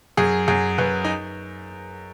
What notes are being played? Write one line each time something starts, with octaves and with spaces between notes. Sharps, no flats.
F#2 G#4
F#2 G#4
F#2 B4
D#4